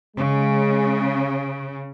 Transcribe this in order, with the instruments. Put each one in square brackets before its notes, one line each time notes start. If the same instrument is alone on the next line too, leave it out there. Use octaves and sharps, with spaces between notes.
[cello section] C#3 [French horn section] G#3